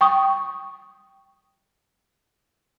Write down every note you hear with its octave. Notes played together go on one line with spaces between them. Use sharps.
G5 C#6 D#6